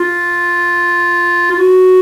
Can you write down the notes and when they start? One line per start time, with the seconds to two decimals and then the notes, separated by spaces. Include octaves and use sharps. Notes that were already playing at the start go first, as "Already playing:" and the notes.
Already playing: F4
1.51 F4
1.59 F#4